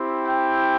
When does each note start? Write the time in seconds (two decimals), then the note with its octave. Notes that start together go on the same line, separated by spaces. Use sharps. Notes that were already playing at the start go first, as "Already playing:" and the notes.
Already playing: C4 E4 G4
0.27 G5